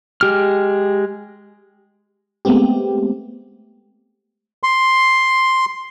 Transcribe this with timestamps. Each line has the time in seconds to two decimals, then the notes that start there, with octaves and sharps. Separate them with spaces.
0.21 G#3 G4 F6
2.45 G#3 A3 B3 C4 G4
4.63 C6